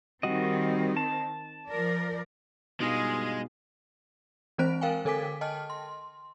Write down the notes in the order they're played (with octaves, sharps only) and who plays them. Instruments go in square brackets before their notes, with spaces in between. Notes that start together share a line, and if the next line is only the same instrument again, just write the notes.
[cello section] D#3 C4 [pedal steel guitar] G3 F#4 D#5
[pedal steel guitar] A5
[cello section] F3 A#4 D5
[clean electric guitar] G2 F4 D#5 [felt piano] B2 D#4 [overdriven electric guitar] G#3 [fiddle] G#4 F5
[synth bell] E3 G#3 C4 C5 F#6 D7
A#4 F5 G5 G#5
D3 A4 A#4 G#5 D6 B6
D#5 G5 A5 F6
C6